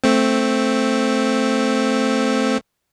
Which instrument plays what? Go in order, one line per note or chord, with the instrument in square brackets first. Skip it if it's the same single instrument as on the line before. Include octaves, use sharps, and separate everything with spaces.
[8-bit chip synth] A3 C4